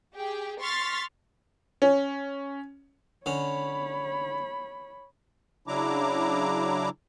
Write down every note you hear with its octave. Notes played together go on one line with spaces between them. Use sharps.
G4 G#4 G5
C6 C#6 F6 A6 B6
C#4
D3 C#4 C#5 B5
C#3 F#3 D4 E4 A#5 D6